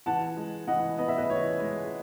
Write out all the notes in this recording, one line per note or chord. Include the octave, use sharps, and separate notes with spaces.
E3 F#5 A5
G#3
E3 D#5 F#5
B3 D#5
E5
B4 D#5
E3 C#5
G#3